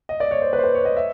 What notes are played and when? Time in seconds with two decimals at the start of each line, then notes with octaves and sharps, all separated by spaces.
0.09 D#5
0.20 D5
0.31 C#5
0.42 C5
0.53 B4
0.59 C5
0.64 B4
0.75 C#5
0.85 D#5
0.97 E5